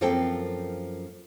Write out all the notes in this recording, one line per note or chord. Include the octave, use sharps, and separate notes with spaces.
F#2 F3 A#3 C4 A4 G5